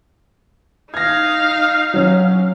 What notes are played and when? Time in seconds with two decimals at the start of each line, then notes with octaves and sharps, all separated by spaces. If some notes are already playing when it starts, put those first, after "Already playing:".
0.94 D#4 F5 G#6 A#6
1.94 F#3 C#4